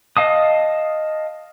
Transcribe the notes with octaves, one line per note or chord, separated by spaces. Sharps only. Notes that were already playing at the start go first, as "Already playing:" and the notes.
D#5 F5 A5 D#6